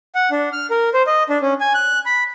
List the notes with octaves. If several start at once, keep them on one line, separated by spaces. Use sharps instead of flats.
F#5
D4
F6
A#4
C5
D#5
D4
C#4
G#5
F#6
B5